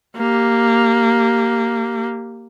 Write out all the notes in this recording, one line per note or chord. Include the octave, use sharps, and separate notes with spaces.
A#3 G4